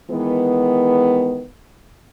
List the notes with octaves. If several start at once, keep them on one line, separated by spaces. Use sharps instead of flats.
D#3 E3 G#3 B3